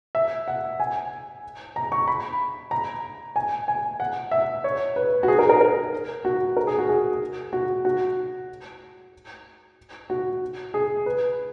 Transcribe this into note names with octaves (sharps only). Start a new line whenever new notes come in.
E5
F#5
G#5
A#5
C#6
B5
A#5
G#5
G#5
F#5
E5
C#5
B4
F#4
G#4
A#4
A#4
A#4
F#4
A#4
G#4
F#4
G#4
F#4
F#4
F#4
G#4
B4